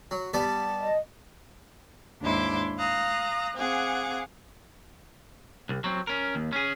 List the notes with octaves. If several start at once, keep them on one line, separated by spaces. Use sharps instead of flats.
F#3
G3 B3 D5 A5
D#5
D#2 G#2 D4 E4 C6 D6
F5 A#5 D#6 F#6
C4 G#4 F5 F#5 D6
C2
F#3 C4
C#4 A#4
D#2
C#4 G#4